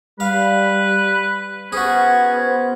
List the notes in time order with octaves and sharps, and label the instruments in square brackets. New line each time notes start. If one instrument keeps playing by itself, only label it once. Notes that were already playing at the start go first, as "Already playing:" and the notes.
[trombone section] G3 [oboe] B4 [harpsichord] F5
[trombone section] B3 C5 [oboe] C#4 [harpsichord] F#4 G#4